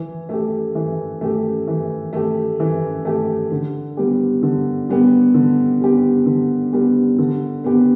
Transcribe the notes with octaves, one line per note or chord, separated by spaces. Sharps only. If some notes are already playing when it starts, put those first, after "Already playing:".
Already playing: E3
A3 G4
E3
A3 G4
E3
A3 G4
E3
A3 G4
D3
G3 B3 G4
D3
G3 B3 G4
D3
G3 B3 G4
D3
G3 B3 G4
D3
B3 G4